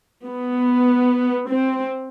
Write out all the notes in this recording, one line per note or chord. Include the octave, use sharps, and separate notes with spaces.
B3
C4